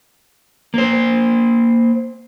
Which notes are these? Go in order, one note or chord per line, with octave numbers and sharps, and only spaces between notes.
A#3 C5